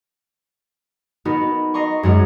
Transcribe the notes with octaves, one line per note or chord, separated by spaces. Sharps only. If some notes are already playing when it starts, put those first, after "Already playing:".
B3 D#4 F#4 A#4 B4
D#5 A#5 C6 C#6
F#2 G#3 F#4 A#4 C#5